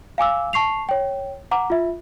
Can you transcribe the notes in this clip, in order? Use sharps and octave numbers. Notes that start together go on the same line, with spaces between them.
F5 G#5 D6 E6
A5 C#6 C7 F7
C#5 G5
F#5 A#5 D6
F4 E5